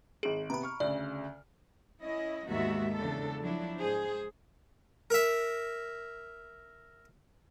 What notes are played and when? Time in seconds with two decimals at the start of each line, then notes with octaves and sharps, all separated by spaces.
0.23 G#1 G#4 D7
0.50 C3 B3 A#5 B5
0.63 C#6 F6
0.80 D2 C#3 D5
2.02 C#4 E4 D#5
2.48 D#2 G#2 G#3 B3 F#4 E5
2.94 E2 C#3 D4 A4
3.41 F3 F#3 D4 E4
3.79 G#2 G#4 C5
5.10 A#4 E5